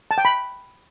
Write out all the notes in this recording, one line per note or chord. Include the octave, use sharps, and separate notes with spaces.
A5
G5
B5